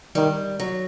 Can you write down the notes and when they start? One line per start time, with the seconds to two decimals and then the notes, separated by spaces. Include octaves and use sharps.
0.15 D#3 G3
0.60 F#3